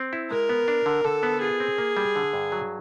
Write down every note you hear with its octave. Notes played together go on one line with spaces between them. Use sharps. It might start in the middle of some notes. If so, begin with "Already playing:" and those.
Already playing: C4
E4
G#3 A#4
B3
D4
D3
D3 A4
B3
F4 G#4
C4
A#3
G3
D3
G2
F#3